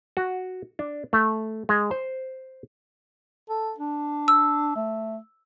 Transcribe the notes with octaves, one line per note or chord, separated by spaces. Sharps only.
F#4
D4
A3
G#3
C5
A4
D4
E6
A3